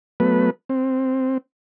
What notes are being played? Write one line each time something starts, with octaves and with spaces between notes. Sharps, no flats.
F#3 A3 B3 B4
C4